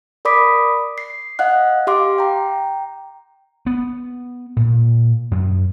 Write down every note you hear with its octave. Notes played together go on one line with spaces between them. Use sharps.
A#4 D5 B5 D6 D#6 B6
C7
D#5 F5 F#5 F#6
G4 F5 C6 D6
G5 A#5
B3
A#2
F#2